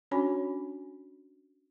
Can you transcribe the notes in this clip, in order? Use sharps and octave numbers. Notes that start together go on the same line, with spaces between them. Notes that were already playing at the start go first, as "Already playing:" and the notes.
C#4 D4 F#4 C#5 G#5 B5